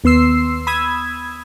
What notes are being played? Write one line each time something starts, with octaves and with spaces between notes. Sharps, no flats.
D#2 B3 C6 E6 C7
B5 D#6 E6 G#6